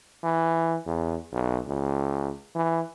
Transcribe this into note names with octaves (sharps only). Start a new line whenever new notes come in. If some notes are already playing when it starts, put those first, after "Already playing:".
E3
E2
B1
C#2
E3